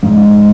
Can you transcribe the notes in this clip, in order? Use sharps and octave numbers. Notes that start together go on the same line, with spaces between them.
G#2